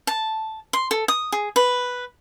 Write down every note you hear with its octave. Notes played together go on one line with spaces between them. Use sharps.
A5
C6
A4
D#6
G#4
B4